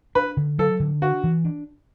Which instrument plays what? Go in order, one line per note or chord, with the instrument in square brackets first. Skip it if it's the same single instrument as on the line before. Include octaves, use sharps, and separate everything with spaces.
[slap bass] D4 [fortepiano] B4
[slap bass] D3
[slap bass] F#3 [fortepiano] A4
[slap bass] D3
[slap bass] D4 [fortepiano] F#4
[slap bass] E3
D4